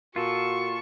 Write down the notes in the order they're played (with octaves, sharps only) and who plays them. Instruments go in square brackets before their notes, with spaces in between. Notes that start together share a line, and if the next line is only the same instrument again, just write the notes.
[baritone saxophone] A#2 [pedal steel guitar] F4 A4 [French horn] F#4 [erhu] C#6